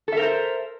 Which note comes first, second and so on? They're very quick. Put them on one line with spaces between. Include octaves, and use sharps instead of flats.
A4 E5 A#4 C5